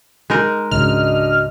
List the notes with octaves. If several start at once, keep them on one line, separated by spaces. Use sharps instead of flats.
G#3 D#4 A#4
C#2 G#2 C#3 D4 F#4 D#5 F6